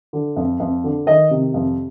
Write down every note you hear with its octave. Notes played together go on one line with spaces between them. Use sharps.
D3
F2
F2
D3
D#3 D#5
C3
F2